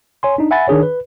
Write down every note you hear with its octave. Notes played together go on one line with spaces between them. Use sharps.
C#5 G#5 C6
D4 D#4
E5 F#5 G#5 B5 A6
D#3 D4 G#4 C#5
B4